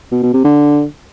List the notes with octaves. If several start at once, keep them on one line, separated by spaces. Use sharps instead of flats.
B2
B2
C3
D3